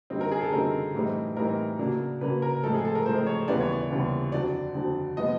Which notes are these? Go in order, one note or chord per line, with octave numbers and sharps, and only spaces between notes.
F#2 D3 G3 C4 D#4
A#4
G#4
A4
F#2 D3 G3 C4 D#4 A#4
A2 E3 G3 C4 D#4
A2 E3 G3 C4 D#4 A#4
C#3 F#3 A#3 D4
C#3 F#3 A#3 D4 B4
A#4
A2 F3 G#3 C4 A4
G#4
A4
A#4
A2 F3 G#3 C4 C5
C#5
D#2 C#3 E3 G3 B3 D5
C#5
D5
D#2 C#3 E3 G3 B3
F2 D3 F#3 D5
F2 D3 F#3
C3 F3 G#3 B3 D#5